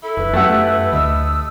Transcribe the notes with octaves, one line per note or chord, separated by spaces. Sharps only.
E4 A4
F1 B4
F#2 A3 G4 F#5
D2 D#5 E6